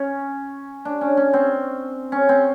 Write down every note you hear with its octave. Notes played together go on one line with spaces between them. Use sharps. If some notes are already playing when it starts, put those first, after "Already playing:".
Already playing: C#4
D4
C#4
C#4
C4
C#4
C4